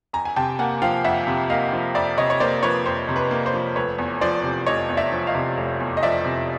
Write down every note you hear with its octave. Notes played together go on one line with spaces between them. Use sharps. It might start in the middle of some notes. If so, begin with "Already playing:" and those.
F2 G#5 A#5
G#5
C3 G5 A5
A#3 F#5 G#5
F3 F5 G5
F2 E5 F#5
C3
A#3 D#5 F5
F3
F2 D5 E5
C3 C#5 D#5
C#5
A#3 C5 D5
F3 B4 C#5
F2 C5
C3
B4
A#3
C5
F3
F1 B4 C#5
E2
F3 C5 D5
C3
F1 C#5 D#5
E2
D5 E5
F3
D#5 F5
C3
F1
E2
D#5
F3 D5 E5
C3